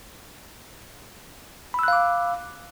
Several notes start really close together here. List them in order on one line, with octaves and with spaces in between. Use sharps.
B5 E6 F#6 F5 D6